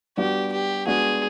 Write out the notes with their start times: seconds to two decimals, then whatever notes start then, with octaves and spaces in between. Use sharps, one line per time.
0.17 G3 B3 D4 F#4 G4
0.52 G4
0.87 G#3 B3 D4 F#4 G#4